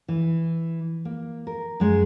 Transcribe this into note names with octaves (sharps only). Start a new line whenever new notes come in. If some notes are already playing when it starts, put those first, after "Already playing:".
E3
A#3
A#4
F#2 G#3